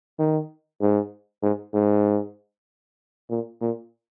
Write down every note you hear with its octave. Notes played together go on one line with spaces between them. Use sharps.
D#3
G#2
G#2
G#2
A#2
A#2